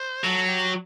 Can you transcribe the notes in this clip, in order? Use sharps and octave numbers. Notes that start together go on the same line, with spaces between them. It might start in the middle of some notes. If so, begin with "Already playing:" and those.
Already playing: C5
F#3 A4
G4